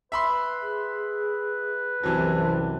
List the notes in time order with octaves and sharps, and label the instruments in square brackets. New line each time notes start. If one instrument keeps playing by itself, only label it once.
[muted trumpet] B4 [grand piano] E5 B5 C6
[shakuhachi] G#4
[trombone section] C2 F#2 C3 [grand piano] E3 F#3 [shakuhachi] A5